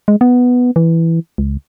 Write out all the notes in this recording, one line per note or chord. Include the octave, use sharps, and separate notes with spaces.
G#3
B3
E3
C#2